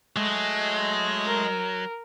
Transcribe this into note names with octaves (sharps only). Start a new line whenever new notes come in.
F#3 G#3 A3 D#5
A#4